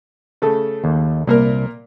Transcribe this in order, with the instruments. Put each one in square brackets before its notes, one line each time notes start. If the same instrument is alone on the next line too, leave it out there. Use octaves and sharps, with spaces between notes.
[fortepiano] C#3 A3 A4
[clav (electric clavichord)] D#2
[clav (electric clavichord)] C2 [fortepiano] A#2 A#3 A#4